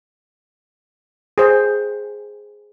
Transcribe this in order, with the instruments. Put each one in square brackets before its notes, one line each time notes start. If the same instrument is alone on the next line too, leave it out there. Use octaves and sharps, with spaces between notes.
[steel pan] G#4 C5